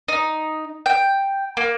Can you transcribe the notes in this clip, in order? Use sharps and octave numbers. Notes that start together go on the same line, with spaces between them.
D#4
G5
A#3